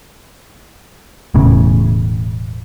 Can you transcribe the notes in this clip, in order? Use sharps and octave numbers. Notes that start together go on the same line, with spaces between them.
E1 A2 C#3